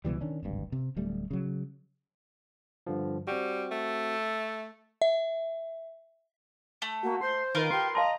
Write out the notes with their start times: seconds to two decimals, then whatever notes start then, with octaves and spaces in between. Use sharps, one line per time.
0.05 C#2 B2 E3 G3
0.21 D#3 C#4 D4
0.43 D1 G#1 G2
0.72 C3
0.96 D1 G3 A3
1.31 C#3 F#3
2.87 G2 D3 F3
3.27 G3 C4 F#4
3.72 A3
5.02 E5
6.82 A3
7.03 A#3 F#4
7.21 C5 C6
7.55 D#3 F4 A#4 B4
7.71 G4 C6
7.95 D#5 F5 A5 A#5 C6